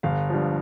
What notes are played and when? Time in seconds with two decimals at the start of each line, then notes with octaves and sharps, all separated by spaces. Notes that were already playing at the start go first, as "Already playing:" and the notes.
0.03 G1 F5
0.30 G2 F3